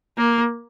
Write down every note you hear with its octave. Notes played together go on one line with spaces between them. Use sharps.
A#3